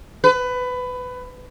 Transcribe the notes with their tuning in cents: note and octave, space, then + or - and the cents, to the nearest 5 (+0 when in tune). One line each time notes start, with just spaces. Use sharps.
B4 +20